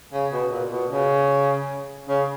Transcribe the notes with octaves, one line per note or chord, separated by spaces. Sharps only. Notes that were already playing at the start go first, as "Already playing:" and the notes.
C#3
B2
A#2
B2
C#3
C#3